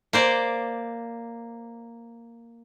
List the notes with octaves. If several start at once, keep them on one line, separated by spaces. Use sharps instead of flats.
A#3 C5 D5